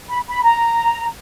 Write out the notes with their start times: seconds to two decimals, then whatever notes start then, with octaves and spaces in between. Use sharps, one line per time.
0.10 B5
0.28 B5
0.44 A#5